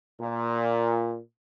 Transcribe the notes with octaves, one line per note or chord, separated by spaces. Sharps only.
A#2